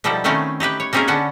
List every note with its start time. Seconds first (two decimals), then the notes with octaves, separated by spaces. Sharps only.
0.04 B2 F3 G3 D#4 E4 A4
0.24 D#3 A3 C4 C#4 D#4 E4
0.60 D#4 E4 G4 B4
0.80 C#5
0.93 A#3 C4 C#4 D#4 G#4 A#4
1.08 D3 B3 C#4 A4 F#5